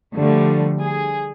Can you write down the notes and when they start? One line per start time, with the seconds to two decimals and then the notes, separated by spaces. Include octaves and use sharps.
0.16 D3 F3 G3 A3
0.83 G#4